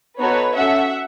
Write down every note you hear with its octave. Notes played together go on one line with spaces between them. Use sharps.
B3 D#4 F#4 A4 B4 C#5
C#4 F#4 A4 E5 F#5